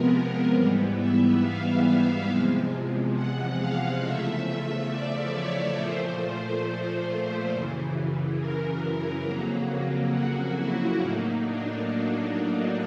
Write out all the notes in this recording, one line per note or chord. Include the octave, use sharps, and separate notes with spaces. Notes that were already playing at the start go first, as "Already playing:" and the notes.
Already playing: C3 F3 G#3 B3 A#4
G#2 E3 G3 B3
E5
F5
E2 C3 F3 G#3
F#5
F5
E2 C#3 F3 A3 E5
D5
C#5
A#2 F3 A3 C5
F#2 C#3 E3
A#4
F2 C#3 F#3 A#3
F#4
E4
A2 F#3 A#3 D#4
D4